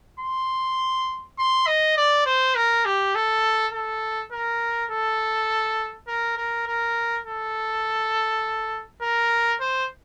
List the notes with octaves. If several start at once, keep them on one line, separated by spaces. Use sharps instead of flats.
C6
C6
D#5
D5
C5
A#4
G4
A4
A4
A#4
A4
A#4
A#4
A#4
A4
A#4
C5